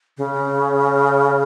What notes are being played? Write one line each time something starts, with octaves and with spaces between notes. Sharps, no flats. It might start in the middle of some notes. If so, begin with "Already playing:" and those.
C#3